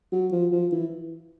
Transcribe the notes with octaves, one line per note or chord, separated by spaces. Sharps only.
F#3
F3
F3
E3